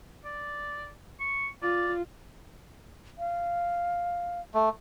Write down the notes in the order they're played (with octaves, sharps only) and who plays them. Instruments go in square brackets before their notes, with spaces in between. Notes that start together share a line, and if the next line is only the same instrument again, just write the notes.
[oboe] D5
C#6
[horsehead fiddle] F4 [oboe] D5
[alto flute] F5
[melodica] A3